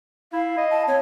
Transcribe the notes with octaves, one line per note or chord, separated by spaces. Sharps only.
E4 F5
D#5
A5
C4 C#5